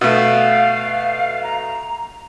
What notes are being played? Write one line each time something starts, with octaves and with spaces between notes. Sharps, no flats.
B2 A3 F5
A#5